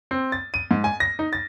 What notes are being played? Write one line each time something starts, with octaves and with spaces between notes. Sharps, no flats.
C4
A6
D#7
G#2
G#5
A#6
D#4
A6